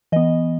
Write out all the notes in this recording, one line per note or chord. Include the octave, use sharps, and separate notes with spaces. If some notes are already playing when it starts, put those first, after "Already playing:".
E3 B3 D#5